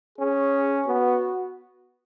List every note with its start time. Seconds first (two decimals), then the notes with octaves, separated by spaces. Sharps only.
0.19 C#4 G#4
0.87 B3 F#4